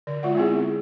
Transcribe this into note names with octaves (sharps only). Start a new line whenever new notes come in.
D3 D5
G#3 F4 D5 F#5
G#3 B3 C4 E4 G#4